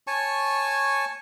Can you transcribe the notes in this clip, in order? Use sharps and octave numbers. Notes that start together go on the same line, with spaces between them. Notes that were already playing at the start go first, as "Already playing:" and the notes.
C#5 G#5 A5 C#6